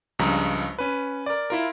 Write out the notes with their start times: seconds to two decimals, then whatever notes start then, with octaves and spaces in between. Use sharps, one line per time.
0.19 C#2 G2 C#3 F3 A#5
0.79 C#4 B4
1.26 A#4 D5
1.50 E4 F4 A#4